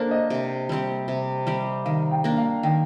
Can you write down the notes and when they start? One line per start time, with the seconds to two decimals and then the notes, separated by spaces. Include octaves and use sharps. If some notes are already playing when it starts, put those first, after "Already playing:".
Already playing: A#3 D4 A4 A#4 C5
0.11 D#5
0.30 C3
0.69 G3 C4 G4
1.08 C3
1.47 G3 C4 G4
1.85 D#3 F5
2.11 G5
2.24 A#3 D4
2.37 F5
2.63 D#3 G5